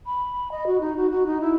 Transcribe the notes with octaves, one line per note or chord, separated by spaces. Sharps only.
B5
D#5
F#4
D#4
F#4
F#4
D#4
E4